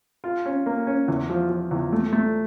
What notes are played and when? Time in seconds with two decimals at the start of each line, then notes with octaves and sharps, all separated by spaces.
0.24 F4
0.45 C#4
0.66 A#3
0.87 C#4
1.08 E2
1.30 F3
1.50 F3
1.71 E2
1.93 A3
2.13 A3